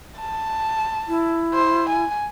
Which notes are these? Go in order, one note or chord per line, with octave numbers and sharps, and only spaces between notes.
A5
E4
C5
G#5